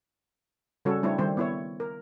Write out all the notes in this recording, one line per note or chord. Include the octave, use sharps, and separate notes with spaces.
C#3 G3 C#4 F#4 A4 C#5
G3 A3 C4 D4 E4 C#5
D#3 G3 C4 C5
B3 E4 C#5
A#4